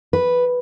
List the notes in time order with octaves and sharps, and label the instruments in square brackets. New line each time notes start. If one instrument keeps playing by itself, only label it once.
[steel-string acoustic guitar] B4